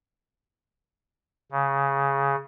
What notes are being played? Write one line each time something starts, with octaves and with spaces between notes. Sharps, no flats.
C#3